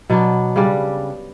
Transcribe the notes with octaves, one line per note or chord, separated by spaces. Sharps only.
B2 F#3 B3 D4
C#3 G3 D4